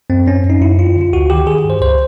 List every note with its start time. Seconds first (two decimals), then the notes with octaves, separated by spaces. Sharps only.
0.10 F#2 C4
0.27 F#2 C#4
0.44 F#2
0.50 D#4
0.61 F#2 E4
0.78 F2 F4
0.96 D3
1.01 F4
1.13 D2 F#4
1.30 D#3 G4
1.46 D#3 G#4
1.64 G2
1.70 C5
1.81 C#2 C5